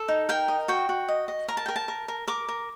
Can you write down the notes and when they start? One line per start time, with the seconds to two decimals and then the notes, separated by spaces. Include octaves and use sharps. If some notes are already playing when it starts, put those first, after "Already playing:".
Already playing: A4
0.08 D#4
0.29 A#4 G5
0.48 D#5
0.68 F#4 G5
0.89 F#4
1.08 D#5
1.28 D#5
1.48 A#4 A#5
1.57 A5
1.66 A#4 G5
1.76 A5
1.88 A#4
2.08 A#4
2.28 A#4 D6
2.48 A#4